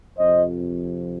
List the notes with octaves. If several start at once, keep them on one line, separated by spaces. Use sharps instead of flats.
F2 C3 F3 C5 D#5